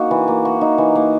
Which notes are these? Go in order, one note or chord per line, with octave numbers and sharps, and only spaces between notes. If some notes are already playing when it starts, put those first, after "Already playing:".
Already playing: A#3 D#4 F#4
E3
A#3
F#4
D#4
E3
A#3